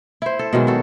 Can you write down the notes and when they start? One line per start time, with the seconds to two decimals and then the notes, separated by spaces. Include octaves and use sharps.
0.22 E4 C5
0.39 A4
0.53 B2 D#3 F#3 G#3
0.67 F#4 A4